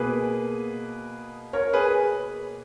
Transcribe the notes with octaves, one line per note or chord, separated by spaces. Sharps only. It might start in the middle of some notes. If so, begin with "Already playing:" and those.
Already playing: B2 A#3 G#4 B4
A#4 C#5
G#4 B4